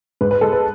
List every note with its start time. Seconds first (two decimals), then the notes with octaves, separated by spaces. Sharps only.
0.21 G#2 B4
0.31 B4
0.41 G#3 A4
0.52 B4